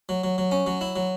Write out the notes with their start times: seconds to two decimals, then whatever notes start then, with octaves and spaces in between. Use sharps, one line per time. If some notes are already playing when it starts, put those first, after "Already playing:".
0.09 F#3
0.24 F#3
0.38 F#3
0.52 C#4
0.67 F#3
0.81 E4
0.96 F#3